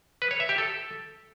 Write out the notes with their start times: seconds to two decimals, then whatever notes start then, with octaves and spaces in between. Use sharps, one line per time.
0.22 B4
0.31 C#5
0.40 E5
0.49 G4
0.58 A4